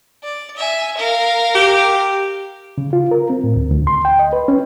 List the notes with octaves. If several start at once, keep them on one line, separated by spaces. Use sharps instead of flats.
D5
E5 G#5
A#4 F5
G4
C#3
F4
A#4
C4
A2
D2
D2
C6
G5
D#5
B4
C#4